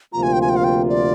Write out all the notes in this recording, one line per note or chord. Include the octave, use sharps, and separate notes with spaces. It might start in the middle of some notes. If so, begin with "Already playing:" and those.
D2 C3 F3 A#3 F4 A#5
G#5
G5
G#5
G5
F5
G5
D5